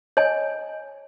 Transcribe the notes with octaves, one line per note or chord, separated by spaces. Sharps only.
C#5 D#5 G#5